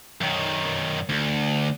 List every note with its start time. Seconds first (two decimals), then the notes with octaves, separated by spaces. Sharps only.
0.21 F#2 D#3
1.09 D2